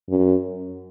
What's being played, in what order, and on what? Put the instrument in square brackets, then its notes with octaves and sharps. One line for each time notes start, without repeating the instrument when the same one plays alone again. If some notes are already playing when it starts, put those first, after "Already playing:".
[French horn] F#2